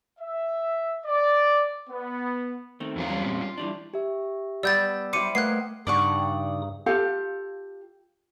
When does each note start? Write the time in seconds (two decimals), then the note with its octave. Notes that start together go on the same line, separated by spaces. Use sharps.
0.20 E5
1.05 D5
1.90 B3
2.80 D#3 A3 C4
2.96 E2 F#3 F4
3.09 G3 G#3 C#4
3.24 A#2 C4
3.40 F4
3.58 E3 G3 D4
3.94 G4 E5
4.63 G3 B3 D5 E6 G6 A6
5.13 G3 E4 C5 D6 C#7 D#7
5.35 A3 A#3 B4 D#5 F#5 F#6 G#6 C7
5.87 G2 C#3 D#4 D5 F#5 C#6 D#6
6.86 F4 G4 A4 F5